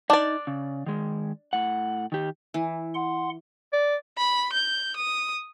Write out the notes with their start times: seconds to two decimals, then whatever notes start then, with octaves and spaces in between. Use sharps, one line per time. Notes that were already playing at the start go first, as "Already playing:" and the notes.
0.10 D4 D#4 D5
0.47 C#3
0.86 D#3 G#3
1.53 A2 F#5
2.12 D#3 G4
2.54 E3
2.94 F#5 C6
3.73 D5
4.18 B5
4.53 G6
4.96 D#6